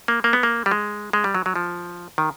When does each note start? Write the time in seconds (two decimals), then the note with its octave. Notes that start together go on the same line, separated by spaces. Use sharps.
0.08 A#3
0.24 A#3
0.33 B3
0.43 A#3
0.66 G3
0.71 G#3
1.13 G#3
1.24 G3
1.35 F#3
1.46 F#3
1.56 F3
2.18 D#3